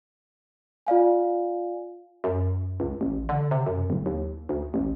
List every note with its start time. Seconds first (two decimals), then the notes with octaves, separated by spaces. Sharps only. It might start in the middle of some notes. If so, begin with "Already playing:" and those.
0.87 F4 D5 F5 G#5
2.24 F#2
2.80 C#2
3.01 A1
3.29 D3
3.51 C3
3.67 F#2
3.90 D1
4.06 D#2
4.49 D2
4.74 A1